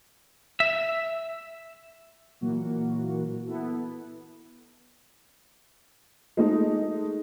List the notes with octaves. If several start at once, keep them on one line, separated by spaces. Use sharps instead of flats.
E5
A#2 E3 F#3 A#3 F#4
B3 E4 A4
G#3 A3 D#4